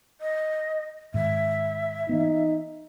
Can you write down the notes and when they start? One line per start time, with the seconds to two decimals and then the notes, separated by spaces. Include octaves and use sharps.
0.21 D#5
1.14 G#2 D#3 E5
2.09 E3 A#3 B3 D#4